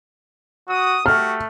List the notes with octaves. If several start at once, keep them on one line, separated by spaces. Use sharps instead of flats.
F#4 D#6
A3 F#4 G4 F6